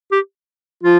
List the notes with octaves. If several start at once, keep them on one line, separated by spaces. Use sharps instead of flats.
G4
F3 F4